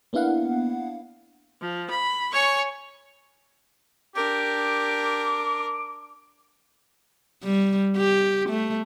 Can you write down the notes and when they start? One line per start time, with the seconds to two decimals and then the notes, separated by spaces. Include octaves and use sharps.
0.13 A#3 B3 D4 E4 F5 F#5
1.60 F3
1.90 B5
2.34 C#5 G#5 C#6
4.16 D4 G4 A#4 D6
7.43 G3
7.97 G4
8.49 A3